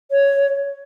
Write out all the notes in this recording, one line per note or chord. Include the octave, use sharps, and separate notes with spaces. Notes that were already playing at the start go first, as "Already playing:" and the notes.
C#5